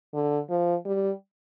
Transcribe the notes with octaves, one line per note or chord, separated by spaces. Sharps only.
D3
F3
G3